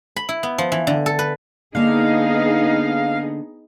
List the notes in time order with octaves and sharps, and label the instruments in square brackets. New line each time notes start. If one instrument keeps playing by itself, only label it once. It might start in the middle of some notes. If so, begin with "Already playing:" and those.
[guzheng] B5
E4
B3
F3
E3
D3
A4
B4
[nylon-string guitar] D3 A#3 [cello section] B3 D#4 G#4 [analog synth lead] F5